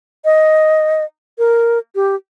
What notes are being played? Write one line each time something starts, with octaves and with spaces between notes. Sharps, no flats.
D#5
A#4
G4